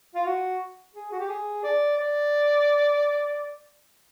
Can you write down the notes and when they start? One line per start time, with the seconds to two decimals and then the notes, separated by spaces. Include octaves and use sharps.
0.15 F4
0.26 F#4
0.94 G#4
1.12 F#4
1.20 G4
1.29 G#4
1.63 D5
1.97 D5